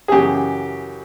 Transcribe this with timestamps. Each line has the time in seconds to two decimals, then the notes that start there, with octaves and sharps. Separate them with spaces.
0.08 G#4
0.12 F#2 C#3 E3 G4